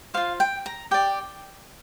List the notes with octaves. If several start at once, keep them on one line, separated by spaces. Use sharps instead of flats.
F4 C5 F5
G5
A#5
G4 D5 G5